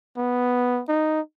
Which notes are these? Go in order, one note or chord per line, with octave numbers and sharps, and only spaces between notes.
B3
D#4